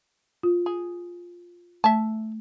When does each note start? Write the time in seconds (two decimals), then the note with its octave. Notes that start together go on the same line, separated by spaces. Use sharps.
0.43 F4
0.66 G#4
1.84 A3 E5 A5